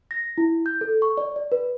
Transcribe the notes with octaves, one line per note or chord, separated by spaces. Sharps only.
A#6
E4
G6
A4
C#6
D5
D5
B4